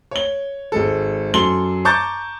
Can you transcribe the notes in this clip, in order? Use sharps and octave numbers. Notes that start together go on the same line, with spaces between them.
C#5 G7
G#1 G#3 A4
F#2 A4 C6 G7
A5 A#5 C#6 D6 G6 A6